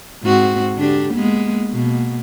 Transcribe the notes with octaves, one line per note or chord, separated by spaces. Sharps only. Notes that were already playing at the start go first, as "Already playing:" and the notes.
G#2 C4 F#4
D3 D4 G4
G#3 A#3 B3
B2 A#3